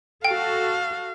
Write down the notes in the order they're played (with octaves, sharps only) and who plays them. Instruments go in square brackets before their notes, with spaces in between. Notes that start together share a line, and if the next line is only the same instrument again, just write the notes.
[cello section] F#4 A4 [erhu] F5 [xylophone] G5